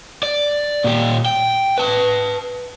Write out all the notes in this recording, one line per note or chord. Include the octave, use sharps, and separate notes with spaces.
D5
A#2 G4
G5
B4 A5